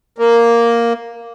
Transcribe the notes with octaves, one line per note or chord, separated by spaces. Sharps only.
A#3